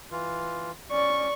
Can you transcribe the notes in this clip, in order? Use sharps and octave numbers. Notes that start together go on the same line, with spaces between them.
E3 F4
C#4 D5 C#6